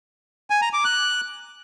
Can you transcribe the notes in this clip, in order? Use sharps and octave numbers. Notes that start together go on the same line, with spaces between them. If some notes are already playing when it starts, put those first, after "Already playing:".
G#5
A#5
D6
F#6